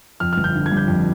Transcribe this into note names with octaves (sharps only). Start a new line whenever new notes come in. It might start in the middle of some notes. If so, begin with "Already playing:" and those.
F2 F6
G1 F6
G6
D3
G#6
G3
G6
F2